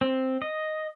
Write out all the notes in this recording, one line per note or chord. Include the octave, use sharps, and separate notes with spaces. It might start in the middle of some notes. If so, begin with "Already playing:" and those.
C4
D#5